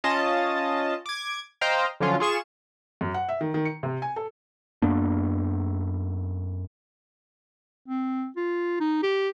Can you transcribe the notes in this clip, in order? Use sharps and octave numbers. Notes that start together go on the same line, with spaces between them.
C#4 F4 D#5 A5
D6 G#6
C5 D#5 F5 G5 A#5
D3 F3 F#3 C#4 F4
F4 G#4 C#6 E7
F#2
F#5
E5
D#3
D#3
C#7
C3
G#5
A4
F#2 A#3 B3 D4
C4
F4
D#4
G4